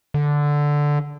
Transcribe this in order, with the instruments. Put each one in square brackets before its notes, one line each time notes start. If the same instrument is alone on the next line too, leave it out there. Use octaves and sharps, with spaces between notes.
[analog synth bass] D3